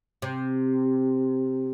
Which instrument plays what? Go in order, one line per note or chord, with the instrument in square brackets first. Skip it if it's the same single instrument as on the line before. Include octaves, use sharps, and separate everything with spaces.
[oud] C3